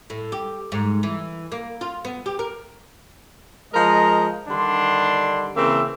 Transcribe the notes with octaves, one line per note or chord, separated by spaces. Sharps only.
A2
G4
G#2
E3
A#3
F4
B3
G4
A#4
F3 G#3 A#4 D#5 A#5
D3 D#3 G3 D4 C6
C#3 E3 A#3 C4 E5